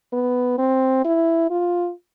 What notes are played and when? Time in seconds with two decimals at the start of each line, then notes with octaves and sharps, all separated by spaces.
0.13 B3
0.58 C4
1.05 E4
1.50 F4